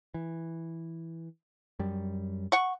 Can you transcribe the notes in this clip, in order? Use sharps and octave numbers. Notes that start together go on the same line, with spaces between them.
E3
F#2 G3
F#5 C#6